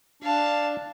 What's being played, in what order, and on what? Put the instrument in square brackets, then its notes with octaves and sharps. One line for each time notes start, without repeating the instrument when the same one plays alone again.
[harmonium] D4 [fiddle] F5 A5